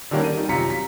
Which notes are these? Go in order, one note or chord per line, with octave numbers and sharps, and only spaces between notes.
D3 D#3 G3 A#3 C#4
D#7
G3 D#4
F#2 C3 F4 A#5 B6 C#7
B6